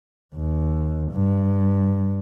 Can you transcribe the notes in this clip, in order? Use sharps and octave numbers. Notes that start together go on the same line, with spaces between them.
D#2
G2